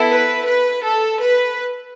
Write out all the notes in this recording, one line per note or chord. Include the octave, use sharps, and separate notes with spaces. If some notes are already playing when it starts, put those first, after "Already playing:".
Already playing: B3 E4 A4
B4
B4
A4
B4